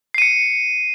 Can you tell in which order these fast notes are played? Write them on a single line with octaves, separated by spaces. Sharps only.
C7 D#7 C#7